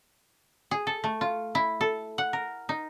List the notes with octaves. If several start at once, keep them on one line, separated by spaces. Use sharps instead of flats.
G#4
A4
A3
F4
E4
A4
F#5
A#4
D#4